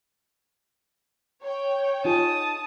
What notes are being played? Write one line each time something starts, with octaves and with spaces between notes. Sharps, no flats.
C#5 G5
D#4 F4 G#4 A5 D#6